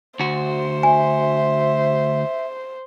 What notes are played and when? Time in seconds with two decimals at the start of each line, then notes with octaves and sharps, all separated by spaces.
0.20 D2 F#4 C5
0.83 E5 G#5